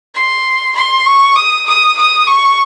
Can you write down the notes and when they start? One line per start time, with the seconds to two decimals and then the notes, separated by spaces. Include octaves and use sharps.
0.14 C6
0.75 C6
1.05 C#6
1.36 D#6
1.66 D#6
1.97 D#6
2.26 C#6